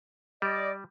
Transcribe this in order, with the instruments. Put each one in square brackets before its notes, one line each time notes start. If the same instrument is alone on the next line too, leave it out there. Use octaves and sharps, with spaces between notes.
[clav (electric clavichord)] G3 [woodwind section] D5 D#5